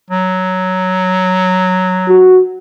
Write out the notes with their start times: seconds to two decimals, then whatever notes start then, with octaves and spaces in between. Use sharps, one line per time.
0.11 F#3
2.09 F#4